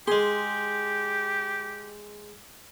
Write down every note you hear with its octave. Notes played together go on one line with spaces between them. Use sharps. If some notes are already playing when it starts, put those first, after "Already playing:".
G#3 G4 G#4 C6